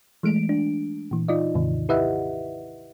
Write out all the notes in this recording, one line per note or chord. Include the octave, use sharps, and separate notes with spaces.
E3 G#3 A3 D7
D4
A#2 E3
D#4 F4 D5 D#5
D#2 G#2 C3 D#3
E4 G4 B4 D#5 E5 F#5